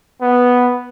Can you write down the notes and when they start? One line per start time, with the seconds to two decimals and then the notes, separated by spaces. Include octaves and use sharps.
0.22 B3